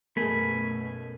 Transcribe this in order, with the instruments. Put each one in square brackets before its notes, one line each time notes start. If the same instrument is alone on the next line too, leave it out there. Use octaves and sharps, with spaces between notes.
[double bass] F#2 B2 [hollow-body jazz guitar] A3 G#4 [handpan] B3 A#4 [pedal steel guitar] G#5 B5